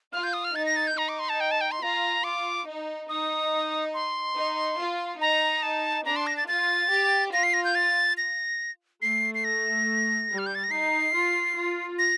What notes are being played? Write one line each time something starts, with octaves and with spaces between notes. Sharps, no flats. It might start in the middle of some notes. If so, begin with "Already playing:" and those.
F4 F6
G6
D#6
F6
D#4 A6
A#6
A6
G6
D#4 A#5
D6
C6
A5
G5
A5
G5
C6
F4 A#5
F4 D6
D#4
D#4 D#6
C6
D#4
F4
D#4 A#5
A5
D4 A#5
C6
A#6
A6
F4 A6
G4
F4 A#6
C7
A#6
G6
A6
A#6
A3 C7
C7
A#6
G3
F6
G6
A6
A#6
D#4 C7
F4
F4
A#6